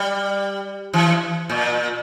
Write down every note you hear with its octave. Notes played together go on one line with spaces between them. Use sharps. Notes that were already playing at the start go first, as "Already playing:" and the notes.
Already playing: G3
E3
A#2